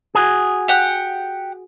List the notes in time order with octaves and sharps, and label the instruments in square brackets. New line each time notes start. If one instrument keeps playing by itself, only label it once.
[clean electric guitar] F#4 G#4
[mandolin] G4 F#5